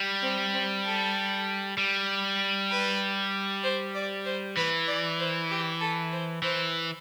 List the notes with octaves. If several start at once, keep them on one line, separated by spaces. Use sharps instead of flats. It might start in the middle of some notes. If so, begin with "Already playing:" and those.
Already playing: G3
C4
C4
A4
G3
B4
C5
D5
C5
E3 B4
D5
C5
G4
A4
C5
E3 C5